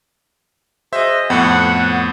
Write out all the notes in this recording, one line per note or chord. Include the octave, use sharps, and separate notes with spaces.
F#4 G#4 C5 D#5 E5
F2 A2 B3 F#5